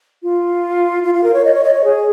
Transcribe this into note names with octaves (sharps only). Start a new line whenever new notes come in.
F4
F4
F4
A#4
C#5
D#5
C#5
D#5
C#5
G#4